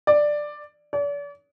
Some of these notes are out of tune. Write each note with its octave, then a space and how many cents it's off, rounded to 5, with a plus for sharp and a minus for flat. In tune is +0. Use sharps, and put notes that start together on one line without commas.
D5 +10
D5 -40